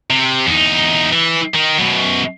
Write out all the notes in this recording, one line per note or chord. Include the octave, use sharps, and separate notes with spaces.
C3
E2 D#4
E3
D#3
F#2 B2